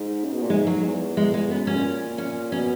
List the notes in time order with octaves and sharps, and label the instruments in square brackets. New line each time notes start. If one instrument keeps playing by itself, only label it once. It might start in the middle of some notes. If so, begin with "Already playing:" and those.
Already playing: [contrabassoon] G#2
C#3
B2
A#2
[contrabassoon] G#2 [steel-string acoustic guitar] G#3
[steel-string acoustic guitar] F#3
[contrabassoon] E2
[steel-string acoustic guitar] G#3
G#3
[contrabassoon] F#2 [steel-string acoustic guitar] B3
[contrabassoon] F#2 [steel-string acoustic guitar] C#4
[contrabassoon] A#2
[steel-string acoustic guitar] C#4
[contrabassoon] B2 [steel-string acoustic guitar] C#4